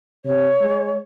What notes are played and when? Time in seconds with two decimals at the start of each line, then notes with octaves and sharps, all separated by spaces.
0.25 C3 C#5
0.62 G#3